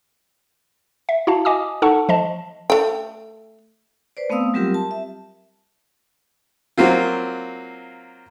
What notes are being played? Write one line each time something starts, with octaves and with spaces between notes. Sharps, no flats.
E5
E4 F#4 F5 A5
D#5 G#5 D6 D#6
D#4 A4 F#5 A5 C#6
F3 D#5 A5
A3 G5
B4 C5 D5
A3 B3 C4 F5 D#6 E6
F#3 G3 C4 F4 G4 A#4
A5
E5
F#3 A#3 C4 F4